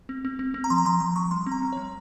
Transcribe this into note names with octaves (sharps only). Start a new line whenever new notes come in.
C4
C4
C4
C4
A#5
F3 C6
A#5
F3 C6
F3 C6
F3 C#6
G3 C6
C4
A#5
G3
G3 C#5